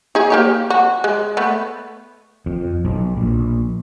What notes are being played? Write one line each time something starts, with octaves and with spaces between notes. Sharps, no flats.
D#4 G#4
A#3 G4 C#5
F#4
G#3
A3 B3
F2
B1
A#1